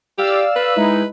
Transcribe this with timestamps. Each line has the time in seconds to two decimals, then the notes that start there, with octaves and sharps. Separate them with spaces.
0.18 G4 D5 F5 E6
0.56 B4
0.76 G#3 D#4 E4